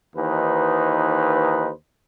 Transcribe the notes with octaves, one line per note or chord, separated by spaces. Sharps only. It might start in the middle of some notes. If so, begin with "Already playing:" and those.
D#2 E3 D#4 B4 C5